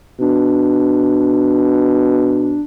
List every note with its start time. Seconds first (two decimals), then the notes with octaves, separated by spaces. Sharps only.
0.20 B2 D4